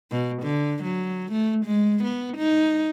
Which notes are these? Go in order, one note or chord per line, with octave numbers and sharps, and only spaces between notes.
B2
D3
F#3
A3
G#3
B3
D#4